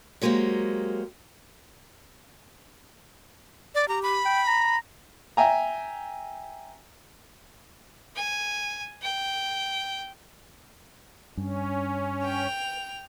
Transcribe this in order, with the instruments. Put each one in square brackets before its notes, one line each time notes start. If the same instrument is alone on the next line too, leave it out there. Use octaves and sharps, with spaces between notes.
[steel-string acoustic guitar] F#3 G#3 A#3 G4 C5
[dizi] D5
[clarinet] G4 [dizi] A#5
[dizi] B5
[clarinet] G5
A#5
[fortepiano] E5 G5 G#5 A#5
[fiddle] G#5
G5
[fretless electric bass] G2 [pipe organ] C#4
[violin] G5 F7